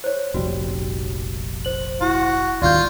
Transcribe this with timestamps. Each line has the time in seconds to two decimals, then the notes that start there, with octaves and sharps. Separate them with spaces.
0.04 C5 C#5
0.34 F1 A#1 G3 F#4
1.65 C5 F#7
2.01 E4 F#4
2.62 D#1 G#1 D#2 F4 D5 C6 G6